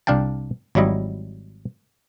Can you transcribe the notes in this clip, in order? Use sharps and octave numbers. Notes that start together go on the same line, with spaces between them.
C2 D4 F5 G5 A5
G#1 F#3 G3 E4 D#5